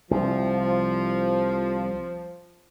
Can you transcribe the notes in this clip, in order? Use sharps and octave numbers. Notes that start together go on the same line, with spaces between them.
C2 F3